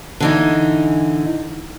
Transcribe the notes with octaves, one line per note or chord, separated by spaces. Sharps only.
D3 E3 D#4